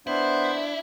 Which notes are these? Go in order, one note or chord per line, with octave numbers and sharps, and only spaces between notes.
B3 D4 E4 C5